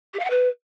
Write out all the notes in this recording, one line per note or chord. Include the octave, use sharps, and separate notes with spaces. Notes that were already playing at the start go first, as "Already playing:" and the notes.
G4
F5
F#5
B4